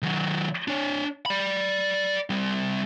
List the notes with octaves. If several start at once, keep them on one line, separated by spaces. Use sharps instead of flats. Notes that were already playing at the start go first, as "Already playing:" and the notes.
D#3 F#3
D4 C#5
D5 B5
G3 C4